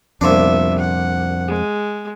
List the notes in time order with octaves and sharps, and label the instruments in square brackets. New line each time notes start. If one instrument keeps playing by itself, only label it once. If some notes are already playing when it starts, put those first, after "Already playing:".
[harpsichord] C2 A#2 D4 [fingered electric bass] F2 [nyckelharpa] B3 E5
[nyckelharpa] F#5
G#3